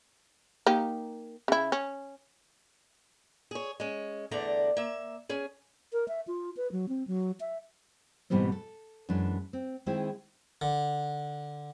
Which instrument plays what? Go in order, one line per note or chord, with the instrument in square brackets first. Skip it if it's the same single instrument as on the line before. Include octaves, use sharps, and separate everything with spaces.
[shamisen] A#3 D#4 G4
C#3 E4
C#4
[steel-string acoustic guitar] G#4 C#5
G#3 C#4
E2 D3 A3 D5 A#5
A#3 E5
C#4 G#4
[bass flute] A#4
E5
F4
B4
F#3
C4
F#3
E5
[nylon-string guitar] G#2 B2 E3 G3 B3 C4
A4
F#2 E3 G#3 D4
C4
D#3 G#3 C4 E4 G#4
[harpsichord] D3